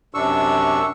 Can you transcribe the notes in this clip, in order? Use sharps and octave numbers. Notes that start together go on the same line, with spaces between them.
F#2 C3 D4 C#6 E6